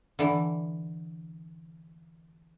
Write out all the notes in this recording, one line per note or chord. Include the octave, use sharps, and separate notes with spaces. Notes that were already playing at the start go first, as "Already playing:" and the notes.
D3 E3